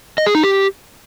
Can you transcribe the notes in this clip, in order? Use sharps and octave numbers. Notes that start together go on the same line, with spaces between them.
D#5
G#4
D#4
G4